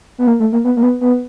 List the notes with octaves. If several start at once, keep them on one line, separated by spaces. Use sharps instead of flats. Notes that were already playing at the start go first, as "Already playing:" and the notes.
B3
A#3
A3
A#3
B3
A#3
B3
B3